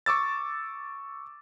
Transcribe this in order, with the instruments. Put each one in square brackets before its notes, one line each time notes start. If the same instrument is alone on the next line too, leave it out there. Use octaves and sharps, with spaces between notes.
[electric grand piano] C#6 D6 E6 A6